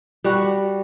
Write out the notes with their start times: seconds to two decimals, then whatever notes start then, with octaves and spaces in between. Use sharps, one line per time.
0.24 G3 F#4